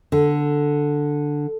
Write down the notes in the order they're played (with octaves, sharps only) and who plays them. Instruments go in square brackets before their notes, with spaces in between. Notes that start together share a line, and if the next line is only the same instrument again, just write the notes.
[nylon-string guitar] D3